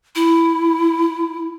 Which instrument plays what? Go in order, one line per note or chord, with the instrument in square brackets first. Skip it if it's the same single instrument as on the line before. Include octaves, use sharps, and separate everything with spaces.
[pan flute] E4